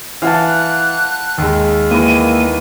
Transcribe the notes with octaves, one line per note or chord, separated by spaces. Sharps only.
E3 F5 F#5 A5
F#6
D#2 G#3
E3 A#3 D#4 D#7